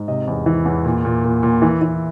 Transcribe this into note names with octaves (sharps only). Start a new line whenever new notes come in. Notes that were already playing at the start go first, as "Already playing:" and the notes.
Already playing: G#2
C3 D#5
E2
E3
E2
A#2
A#2
A#2
A#2
E3
E3